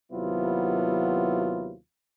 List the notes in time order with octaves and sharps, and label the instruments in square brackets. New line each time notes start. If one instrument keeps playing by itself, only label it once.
[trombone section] D#2 C3 F#3 B3 E4 F4